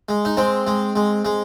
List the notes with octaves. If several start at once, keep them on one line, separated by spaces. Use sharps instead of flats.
G#3
D#4
G#3 C4
G#3
G#3
G#3